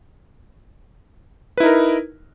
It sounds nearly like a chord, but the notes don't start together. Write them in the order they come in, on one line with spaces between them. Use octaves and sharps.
B4 E4 D#4 A#4